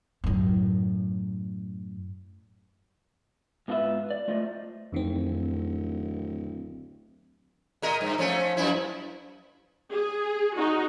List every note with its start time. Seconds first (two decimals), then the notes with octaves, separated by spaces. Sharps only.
0.24 F#2 A2
3.68 G#2 B3 F4 B4 E5
4.10 D5
4.28 A3 F4 C5 D#5
4.92 D1 F2 D#3 C4
7.82 A#2 A#4 D#5
8.01 G2
8.18 F3 A3 C#4
8.57 F#2 F3 E4
9.92 G#4
10.57 D#4 F#4 D#5